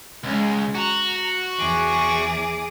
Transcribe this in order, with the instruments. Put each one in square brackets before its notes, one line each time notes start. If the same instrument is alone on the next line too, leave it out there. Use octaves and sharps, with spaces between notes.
[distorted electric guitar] C#2 [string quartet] G#3 C#4
[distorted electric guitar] F#4 [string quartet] A#5
[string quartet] E2 G#4 D6